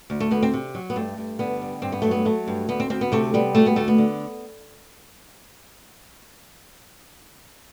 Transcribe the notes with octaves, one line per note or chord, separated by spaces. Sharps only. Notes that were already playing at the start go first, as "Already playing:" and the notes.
D2
A3
D2 B3
C4
C3
F#3
B3
G2 A3
G2
D3 B3
G3
G2 C4
B3
F#3 A3
B3
F#3 A3
G2
D2 B3
C4
D2 C4
B3
C3 A3
G3 B3
D2 A3
B3
D2 A3
B3
D3